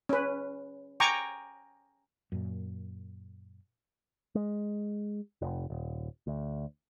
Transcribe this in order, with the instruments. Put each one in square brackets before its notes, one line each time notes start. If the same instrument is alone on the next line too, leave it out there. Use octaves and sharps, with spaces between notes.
[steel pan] C#4 B4
G5 G#5 A#5 C#6 D6
[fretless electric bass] F#2 A#2
[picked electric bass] G#3
F1
D#1
D2